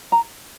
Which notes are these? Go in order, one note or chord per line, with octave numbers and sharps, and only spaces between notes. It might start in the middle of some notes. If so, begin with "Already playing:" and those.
A#5